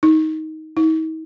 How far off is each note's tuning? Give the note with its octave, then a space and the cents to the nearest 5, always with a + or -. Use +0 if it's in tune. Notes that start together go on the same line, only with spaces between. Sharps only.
D#4 +15
D#4 +40